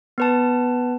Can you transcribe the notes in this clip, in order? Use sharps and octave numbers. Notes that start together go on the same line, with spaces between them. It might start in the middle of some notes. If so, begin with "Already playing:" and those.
B3 B4 A5